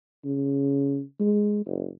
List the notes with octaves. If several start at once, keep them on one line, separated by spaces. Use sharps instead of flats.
C#3
G#3
F#1